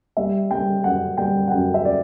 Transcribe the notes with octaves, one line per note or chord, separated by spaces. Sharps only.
G3 E5
G3 G5
F#2 F#5
G3 G5
F#5
F#2 G5
E5
D5